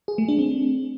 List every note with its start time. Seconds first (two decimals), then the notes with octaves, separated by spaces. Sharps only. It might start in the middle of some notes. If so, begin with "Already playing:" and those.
0.08 G#4
0.18 A3
0.28 D4
0.39 C4